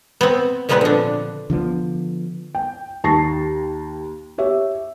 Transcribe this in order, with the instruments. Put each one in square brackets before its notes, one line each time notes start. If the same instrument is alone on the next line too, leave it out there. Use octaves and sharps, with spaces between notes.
[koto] B3 C4
A#2 F3 G#3 B3 C4 B4
D3 D4
[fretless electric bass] D3 F3 A#3 B3
[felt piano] G5
D#2 A5 C#6 A#6 C7
G4 C#5 E5